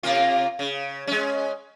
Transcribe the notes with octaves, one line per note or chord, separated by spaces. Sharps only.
C3 A#3 F4
C#3
G#3 C#4